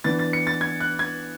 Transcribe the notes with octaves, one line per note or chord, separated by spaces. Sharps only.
E3 B3 D4 A6
A6
C#7
A6
G#6
F#6
G#6